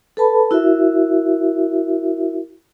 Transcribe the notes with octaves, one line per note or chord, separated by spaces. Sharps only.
A4 B4 A5 B5
E4 F#4 A#4 E5